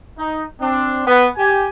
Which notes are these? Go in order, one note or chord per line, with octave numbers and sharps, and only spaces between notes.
D#4
C4 D4
B3 B4
G4 G#5